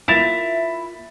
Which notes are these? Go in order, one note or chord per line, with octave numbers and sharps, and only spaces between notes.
A#3 E4 F4 E5 A6 E7 F7